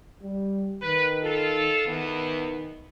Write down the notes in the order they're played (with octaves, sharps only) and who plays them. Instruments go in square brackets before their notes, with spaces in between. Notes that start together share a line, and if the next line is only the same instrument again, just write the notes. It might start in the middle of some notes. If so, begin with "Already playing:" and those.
[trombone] G3
[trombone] D#3 [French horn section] B4
[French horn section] F4 A4
[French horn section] E2 B3 [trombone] D#3